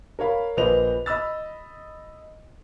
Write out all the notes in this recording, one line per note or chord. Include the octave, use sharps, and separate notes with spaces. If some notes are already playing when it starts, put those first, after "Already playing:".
A#4 C#5 F5 B5
A#1 A#2 B4 C5 D#5 F7
D#5 B5 E6 A6